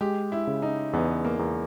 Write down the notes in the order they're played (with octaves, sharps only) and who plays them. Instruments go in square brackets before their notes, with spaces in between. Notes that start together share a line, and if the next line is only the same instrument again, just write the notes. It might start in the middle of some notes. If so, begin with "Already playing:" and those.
[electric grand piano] G#3 [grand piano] G4
[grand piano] E4
[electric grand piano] C#3
[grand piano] D#4
[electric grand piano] E2 [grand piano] B3
[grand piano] A#3
[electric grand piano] E2